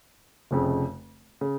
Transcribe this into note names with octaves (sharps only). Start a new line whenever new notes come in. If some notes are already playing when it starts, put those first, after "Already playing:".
F1 F2 C#3
C#3